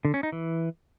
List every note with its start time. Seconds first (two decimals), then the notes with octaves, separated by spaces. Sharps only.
0.05 D3
0.14 C#4
0.23 D#4
0.32 E3